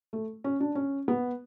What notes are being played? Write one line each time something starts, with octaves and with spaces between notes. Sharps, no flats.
A3
C#4
D4
C#4
B3